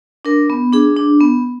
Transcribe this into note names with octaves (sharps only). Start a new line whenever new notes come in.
D4 A#4
B3
D4 G#4
D4
B3